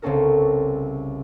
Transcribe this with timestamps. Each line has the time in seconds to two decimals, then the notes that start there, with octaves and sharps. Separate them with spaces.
0.02 C2 C#3 C4 C#4 A4 A#4